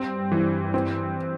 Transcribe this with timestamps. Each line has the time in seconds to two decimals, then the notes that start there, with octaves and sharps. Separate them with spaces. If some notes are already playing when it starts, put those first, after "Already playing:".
Already playing: G2 G3 C4
0.32 E3
0.74 C4